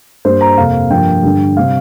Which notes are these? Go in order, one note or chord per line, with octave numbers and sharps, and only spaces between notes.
G2 G3 A#3 C5
A#5
F2 C3 A#3 F5
G2 F3 A#3 G5
G2 D3 G3
C3 G3 C4 F5